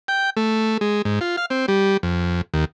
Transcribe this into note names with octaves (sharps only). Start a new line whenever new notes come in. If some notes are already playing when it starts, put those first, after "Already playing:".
G5
A3
G#3
G#2
F4
F5
C4
G3
F2
D#2